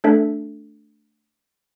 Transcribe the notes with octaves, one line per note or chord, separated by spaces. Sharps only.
A3 D4 A4 E5